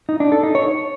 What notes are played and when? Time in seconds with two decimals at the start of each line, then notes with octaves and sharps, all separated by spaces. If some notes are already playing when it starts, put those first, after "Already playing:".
0.09 D#4
0.20 D4
0.32 A4
0.43 D#4
0.55 C#5